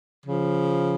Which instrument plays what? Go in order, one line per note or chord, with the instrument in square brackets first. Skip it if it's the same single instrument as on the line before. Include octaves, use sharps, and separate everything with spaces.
[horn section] C#3 F3